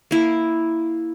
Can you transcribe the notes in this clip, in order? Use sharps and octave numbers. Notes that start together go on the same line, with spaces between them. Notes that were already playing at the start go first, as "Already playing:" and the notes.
A#3 E4